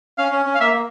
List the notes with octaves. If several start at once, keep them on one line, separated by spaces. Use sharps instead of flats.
C#4 F5
C#4
C#4
F5
A#3 E5
A#3